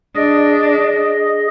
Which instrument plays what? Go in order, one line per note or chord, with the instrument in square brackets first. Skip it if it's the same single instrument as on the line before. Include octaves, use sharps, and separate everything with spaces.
[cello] D4 [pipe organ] G#4 D#5